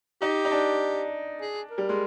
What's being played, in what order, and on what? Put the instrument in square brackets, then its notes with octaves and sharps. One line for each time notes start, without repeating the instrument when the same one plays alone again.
[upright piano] D#4 [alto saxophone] G4
[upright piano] D#4
D4
[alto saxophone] G#4
A#4
[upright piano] G3
G#3